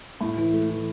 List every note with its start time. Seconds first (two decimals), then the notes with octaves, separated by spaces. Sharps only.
0.21 A2 E4
0.37 E3
0.52 A3
0.69 E3